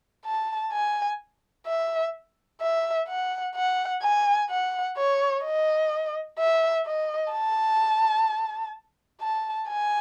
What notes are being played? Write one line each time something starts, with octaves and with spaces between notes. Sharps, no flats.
A5
G#5
E5
E5
F#5
F#5
G#5
F#5
C#5
D#5
E5
D#5
A5
A5
G#5